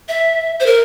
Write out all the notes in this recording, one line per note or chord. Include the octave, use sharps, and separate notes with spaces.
E5
C5
A#4